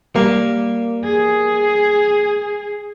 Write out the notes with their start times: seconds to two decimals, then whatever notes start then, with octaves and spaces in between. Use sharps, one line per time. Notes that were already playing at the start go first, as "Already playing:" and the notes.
0.16 G3 A#3
1.04 G#4